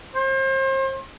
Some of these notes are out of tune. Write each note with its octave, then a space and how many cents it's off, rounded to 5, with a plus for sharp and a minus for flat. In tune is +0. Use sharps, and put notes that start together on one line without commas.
C5 +35